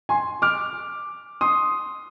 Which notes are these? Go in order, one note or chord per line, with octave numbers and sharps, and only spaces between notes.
G#5 C6
D6 F6
C6 D#6